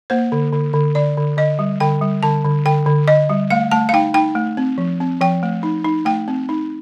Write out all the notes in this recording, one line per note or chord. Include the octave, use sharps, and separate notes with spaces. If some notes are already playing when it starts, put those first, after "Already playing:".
A#3 C5
D3
D3
D3
D3 D5
D3
D3 D#5
G3
D3 G5
G3
D3 A5
D3
D3 G5
D3
D3 D#5
G3
A3 F5
A3 A5
F5
D#4 G5
D#4 G5
A3
C4
F3
C4
F3 G5
A3
D#4
D#4
A3 G5
C4
D#4